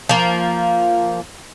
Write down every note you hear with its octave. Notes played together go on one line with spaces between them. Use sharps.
F3 A#3